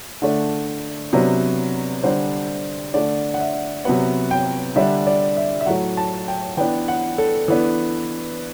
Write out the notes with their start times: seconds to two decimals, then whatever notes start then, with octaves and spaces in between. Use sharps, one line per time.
0.22 D3 A3 D4
1.13 C3 F#3 B3 D4
2.03 D3 G3 D4 C5
2.94 D3 A3 D4 D5
3.34 F#5
3.40 E5
3.85 C3 F#3 B3 F#5
4.31 G5
4.76 D3 G3 D4 E5
5.07 D5
5.37 E5
5.61 E5
5.66 A2 F#3 A3 F#5
5.97 A5
6.28 G5
6.57 E3 B3 D4 G5
6.88 F#5
7.18 A4
7.48 E3 B3 D4